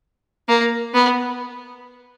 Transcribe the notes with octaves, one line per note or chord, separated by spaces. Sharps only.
A#3
B3